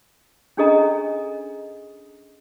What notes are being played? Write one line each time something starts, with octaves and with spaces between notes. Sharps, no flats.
C#4 D4 G#4 A4 D#5 A#5